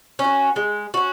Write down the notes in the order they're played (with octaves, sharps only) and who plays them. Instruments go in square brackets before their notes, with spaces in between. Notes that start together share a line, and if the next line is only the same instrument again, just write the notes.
[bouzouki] C#4
F#4
G#3
C#4 F#4